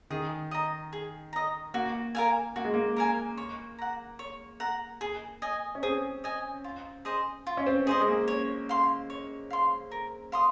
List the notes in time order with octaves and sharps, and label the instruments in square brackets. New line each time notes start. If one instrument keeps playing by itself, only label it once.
[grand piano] D#3 [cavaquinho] G#4
[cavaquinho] D#5 A#5
G#4
D#5 A#5
[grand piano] A#3 [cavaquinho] F#4
[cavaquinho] A#4 F5 G#5
[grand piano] A#3 [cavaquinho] F#4
[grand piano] G#3
A#3
[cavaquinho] A#4 F5 G#5
C#5
F#5 A#5
C#5
F#5 A#5
G#4
D#5 G#5
[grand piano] C#4
[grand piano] C4 [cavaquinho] G#4
[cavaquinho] D#5 G#5
F4
G#4 C5 D#5
F4
[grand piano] C#4
C4
[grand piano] C4 [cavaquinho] G#4 C5 D#5
[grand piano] G#3
A#3
[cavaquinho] C#5
F5 C6
C#5
F5 C6
A#4
F5 C6 D#6